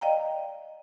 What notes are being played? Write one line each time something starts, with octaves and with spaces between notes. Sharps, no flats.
D5 D#5 F5 G5 A#5